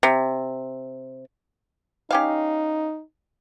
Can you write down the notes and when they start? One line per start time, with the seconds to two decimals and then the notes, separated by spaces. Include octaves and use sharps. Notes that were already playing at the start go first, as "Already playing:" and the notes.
0.03 C3
2.11 C#4 D#4 G4 F5